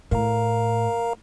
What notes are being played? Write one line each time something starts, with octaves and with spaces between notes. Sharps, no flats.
A2 A#4 F5 A#5